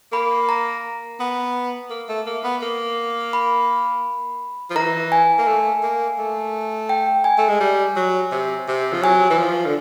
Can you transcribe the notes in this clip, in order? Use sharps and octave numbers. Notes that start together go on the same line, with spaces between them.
A#3 B5
A#5
B3
A#3
A3
A#3
B3
A#3
B5
F3
E3 A#5
G#5
A#3
A3
A#3
A3
G5
G#5
A3
G#3
G3
F#3
C3
C3
F3
F#3 G#5
E3
F3
D3